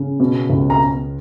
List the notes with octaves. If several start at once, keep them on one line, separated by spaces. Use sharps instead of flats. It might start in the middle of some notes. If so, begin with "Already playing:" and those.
Already playing: C#3
B2
C#2
A#5